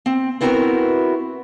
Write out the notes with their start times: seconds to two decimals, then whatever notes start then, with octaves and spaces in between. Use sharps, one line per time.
0.06 C4
0.41 B3 C4 E4 F#4 G4 A#4